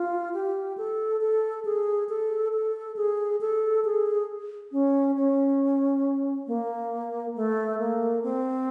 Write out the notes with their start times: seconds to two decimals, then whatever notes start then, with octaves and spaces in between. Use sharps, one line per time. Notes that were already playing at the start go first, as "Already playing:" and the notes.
Already playing: F4
0.34 G4
0.78 A4
1.21 A4
1.65 G#4
2.09 A4
2.53 A4
2.96 G#4
3.41 A4
3.85 G#4
4.72 C#4
5.16 C#4
6.47 A#3
7.36 A3
7.79 A#3
8.23 C4